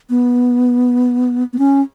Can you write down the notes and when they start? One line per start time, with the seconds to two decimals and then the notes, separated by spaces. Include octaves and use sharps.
0.10 B3
1.53 B3
1.58 C#4